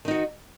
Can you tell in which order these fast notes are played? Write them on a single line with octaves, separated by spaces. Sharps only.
D#3 D#4 F#4